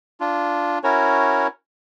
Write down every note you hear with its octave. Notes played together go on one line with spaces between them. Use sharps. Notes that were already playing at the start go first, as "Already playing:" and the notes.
D4 F4
C#4 E4 F#4 A#4 C#5